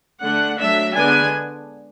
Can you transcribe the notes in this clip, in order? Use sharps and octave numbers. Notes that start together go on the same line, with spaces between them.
D3 A3 D4 F#5
F#3 A3 D4 E5
D3 G#3 B3 D4 G#5